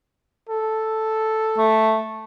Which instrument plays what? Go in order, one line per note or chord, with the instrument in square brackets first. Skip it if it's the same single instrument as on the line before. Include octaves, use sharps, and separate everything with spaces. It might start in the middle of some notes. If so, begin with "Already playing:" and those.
[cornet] A4
[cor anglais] A3